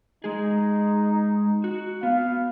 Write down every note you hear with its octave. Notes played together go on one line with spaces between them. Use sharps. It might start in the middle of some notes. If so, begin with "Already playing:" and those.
G#3 D#4 G#4
F#4
B3 F5